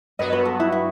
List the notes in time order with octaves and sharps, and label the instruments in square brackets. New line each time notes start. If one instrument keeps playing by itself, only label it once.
[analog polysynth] G2 F#3 B3 F#4 [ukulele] B4 D#5
[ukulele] B4
A4
E4
E4